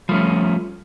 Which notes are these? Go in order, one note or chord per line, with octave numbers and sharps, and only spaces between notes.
F3 G3 A3 C#4